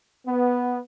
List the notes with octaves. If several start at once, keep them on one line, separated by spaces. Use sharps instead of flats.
B3